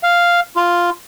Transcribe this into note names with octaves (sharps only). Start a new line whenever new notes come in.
F5
F4